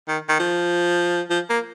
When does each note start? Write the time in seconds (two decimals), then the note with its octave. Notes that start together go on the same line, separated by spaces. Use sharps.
0.09 D#3
0.29 D#3
0.39 F3
1.30 F3
1.50 A#3